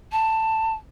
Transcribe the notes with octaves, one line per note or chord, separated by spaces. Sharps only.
A5